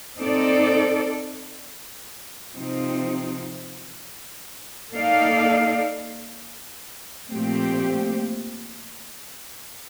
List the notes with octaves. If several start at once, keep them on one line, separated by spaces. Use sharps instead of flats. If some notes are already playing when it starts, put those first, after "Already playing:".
C4 D#4 A4 D5
C3 F3 C4 D#4
A#3 D#4 A4 D5 F5
A#2 F3 A3 C4 G4